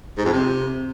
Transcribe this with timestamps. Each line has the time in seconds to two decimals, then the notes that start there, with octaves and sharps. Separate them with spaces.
0.18 G#2
0.25 F2
0.32 C3